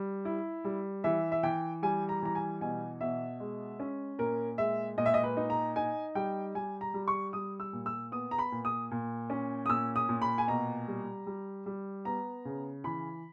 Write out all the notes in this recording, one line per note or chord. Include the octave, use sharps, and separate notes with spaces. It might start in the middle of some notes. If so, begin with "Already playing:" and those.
Already playing: G3
E4
G3
E3 E5
E5
E3 G5
G3 G#5
A#5
E3 A#5
G#5
B2 G#5
B2 E5
G#3
C#4
A#2 A#4
G#3 E5
A#2 D#5
E5
D#5
B4
D#4
A#5
D#4 G#5
G3 G5
G3 G#5
A#5
G3
C#6
G3 D#6
E6
A#2
E6
B3 D#6
A#5
B5
A#2
D#6
A#2
C#4
D#6
A#2 E6
D#6
A#2
B5
G#5
B2 A#5
G3
G3
G3
B3 A#5
C#3
E3 B5